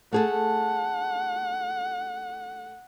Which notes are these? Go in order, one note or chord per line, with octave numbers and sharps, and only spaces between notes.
A3 G#4 A4 F#5